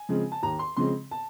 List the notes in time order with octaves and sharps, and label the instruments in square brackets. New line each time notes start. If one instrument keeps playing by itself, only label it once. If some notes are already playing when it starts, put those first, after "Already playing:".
Already playing: [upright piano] G#5
C#3 F3 G#3 C4
A5
D#2 A#5
C6
C#3 F3 G#3 C4 C6
A5